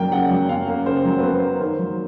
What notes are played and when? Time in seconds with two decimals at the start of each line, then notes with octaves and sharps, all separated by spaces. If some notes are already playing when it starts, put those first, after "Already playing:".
Already playing: F#2 C#3 F#3 A#3 G5
0.12 C#3 F#5
0.31 F#3
0.49 F#2 F5
0.68 A#3
0.86 C#3 C5
1.05 F#3
1.19 B4
1.23 F#2 C5
1.42 A#3
1.61 D#3 C5
1.79 F#3